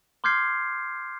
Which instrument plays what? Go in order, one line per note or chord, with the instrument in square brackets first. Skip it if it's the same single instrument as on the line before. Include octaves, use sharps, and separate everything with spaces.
[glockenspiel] C6 D6 F6 G6 G#6 C7